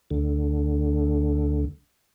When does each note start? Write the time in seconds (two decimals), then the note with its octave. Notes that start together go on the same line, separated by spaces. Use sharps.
0.10 D2 D3